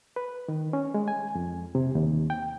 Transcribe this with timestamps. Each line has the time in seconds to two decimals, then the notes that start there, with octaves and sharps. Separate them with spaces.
0.16 B4
0.48 D#3
0.73 C#4
0.94 G#3
1.08 G#5
1.35 F2
1.75 C3
1.95 D#2
2.30 G5